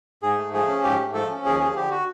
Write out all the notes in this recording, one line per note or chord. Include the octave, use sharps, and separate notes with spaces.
G#2 G#4
A3
F3 G#4
C#4
G#2 G4
A3
F3 A4
C#4
D#2 G#4
F3 G#4
D3 G4
F#4